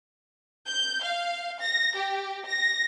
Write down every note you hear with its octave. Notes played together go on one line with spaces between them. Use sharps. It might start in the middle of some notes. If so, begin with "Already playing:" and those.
G6
F5
A#6
G4
A#6